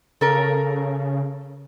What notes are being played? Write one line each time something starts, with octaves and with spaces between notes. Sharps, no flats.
C#3 A4 A#4